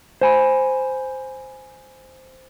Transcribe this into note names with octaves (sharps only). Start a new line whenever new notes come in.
C5 G#5 B5